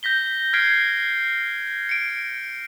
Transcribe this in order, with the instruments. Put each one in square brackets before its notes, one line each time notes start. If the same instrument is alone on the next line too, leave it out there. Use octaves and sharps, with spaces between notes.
[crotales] G6 A#6 B6 G7
F6 G#6 B6 C7 D7
C#7 D7